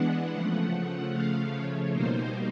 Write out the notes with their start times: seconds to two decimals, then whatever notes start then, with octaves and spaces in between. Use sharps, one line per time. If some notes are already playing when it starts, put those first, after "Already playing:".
Already playing: E3 G#3 B3 D4 F#5
0.33 C#3 F3 A3
1.12 F5
1.52 C#5
1.92 B2 G3 A#3 D#4 C5